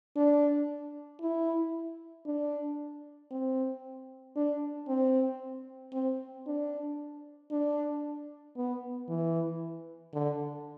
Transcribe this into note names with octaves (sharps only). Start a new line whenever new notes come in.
D4
E4
D4
C4
D4
C4
C4
D4
D4
B3
E3
D3